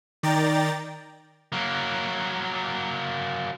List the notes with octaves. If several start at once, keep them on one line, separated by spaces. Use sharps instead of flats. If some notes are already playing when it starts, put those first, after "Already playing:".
D#3 D5 G5 A#5 A6
F#3 A#3